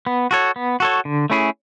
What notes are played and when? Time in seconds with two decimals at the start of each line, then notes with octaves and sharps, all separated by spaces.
0.07 B3
0.31 F#4 A4 C#5
0.56 B3
0.80 F#4 A4 C#5
1.05 D3
1.30 A3 C#4 E4 G#4